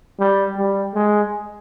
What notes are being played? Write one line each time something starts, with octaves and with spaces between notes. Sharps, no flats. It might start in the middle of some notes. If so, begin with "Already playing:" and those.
G3
G3
G#3